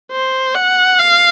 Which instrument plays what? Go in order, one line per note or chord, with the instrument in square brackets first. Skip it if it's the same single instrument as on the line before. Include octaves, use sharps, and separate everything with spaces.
[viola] C5
F#5
F5